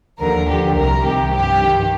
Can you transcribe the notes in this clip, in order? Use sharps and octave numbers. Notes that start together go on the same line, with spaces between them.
D#2 D3 F3 A#4
D2 D3 F3 G4
C2 C3 F3 A#4
C2 C3 D#3 G4
G2 F3 G4
G2 D#3